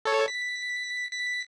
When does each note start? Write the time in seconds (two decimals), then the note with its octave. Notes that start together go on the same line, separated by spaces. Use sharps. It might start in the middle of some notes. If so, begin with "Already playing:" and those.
0.05 A4 C#5
0.28 B6
1.13 B6